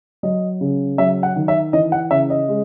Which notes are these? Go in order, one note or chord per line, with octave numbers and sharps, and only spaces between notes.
F#3 D#5
C#3
F#3 E5
F#5
D#3
E5
E3 D#5
F#5
C#3 E5
D#5
G#3